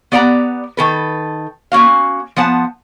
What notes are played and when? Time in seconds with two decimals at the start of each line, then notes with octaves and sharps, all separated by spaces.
0.12 B3 G4 D5 F#5 G#5 A#5
0.77 D#3 A4 B4
1.72 A#3 C#4 F#4 F5
2.36 F3 B3 F#5 A5